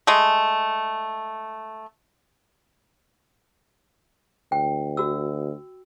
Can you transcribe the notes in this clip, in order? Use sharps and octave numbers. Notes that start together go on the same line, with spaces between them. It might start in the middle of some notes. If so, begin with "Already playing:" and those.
G#3 A3
D2 G5
F#4 E6